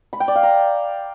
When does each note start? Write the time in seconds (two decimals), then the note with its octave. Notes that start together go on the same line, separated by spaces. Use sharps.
0.13 B5
0.20 G5
0.28 D5
0.35 F5
0.43 A#5